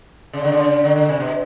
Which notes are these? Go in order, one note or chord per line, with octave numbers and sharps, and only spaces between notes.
C#3
D3
C#3
D3
D3
C3
B2